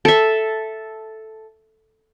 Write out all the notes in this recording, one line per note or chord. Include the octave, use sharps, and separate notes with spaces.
A4 E5